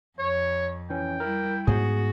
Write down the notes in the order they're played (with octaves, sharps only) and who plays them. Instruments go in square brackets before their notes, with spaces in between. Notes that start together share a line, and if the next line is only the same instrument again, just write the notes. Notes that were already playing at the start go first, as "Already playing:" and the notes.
[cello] F2 [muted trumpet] C#5
[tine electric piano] E3 C#4 [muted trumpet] G5
[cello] G3 E4 [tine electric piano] A#4
[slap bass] G#2 B3 [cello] F#4 [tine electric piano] G#4